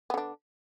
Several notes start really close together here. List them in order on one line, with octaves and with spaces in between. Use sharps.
B3 D3 D4